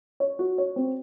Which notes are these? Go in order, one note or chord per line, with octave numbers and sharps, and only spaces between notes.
C#5
F#4
C#5
C4